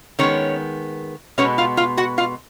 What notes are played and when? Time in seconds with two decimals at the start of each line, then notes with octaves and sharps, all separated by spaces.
0.19 D#3 G#3 B3 C#4 C#5
1.38 B2 G#3 B3 C#4 C#5
1.58 F4 F5
1.77 F4 F5
1.97 F#4 F#5
2.18 F4 F5